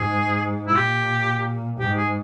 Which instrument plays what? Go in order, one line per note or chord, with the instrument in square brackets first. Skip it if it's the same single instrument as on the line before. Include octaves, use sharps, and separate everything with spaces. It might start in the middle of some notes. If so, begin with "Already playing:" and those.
Already playing: [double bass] G#2 [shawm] G#4
[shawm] E4
[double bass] A#2 [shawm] G4
[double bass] G#2 [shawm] G4
[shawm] G#4